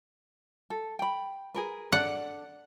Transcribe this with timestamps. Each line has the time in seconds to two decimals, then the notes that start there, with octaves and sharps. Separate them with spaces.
0.70 A4
0.99 G5 B5
1.54 G#4 A#4 B4
1.92 D4 A4 D5 F#5